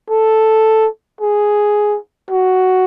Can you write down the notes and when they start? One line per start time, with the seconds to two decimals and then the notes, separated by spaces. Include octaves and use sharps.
0.10 A4
1.21 G#4
2.31 F#4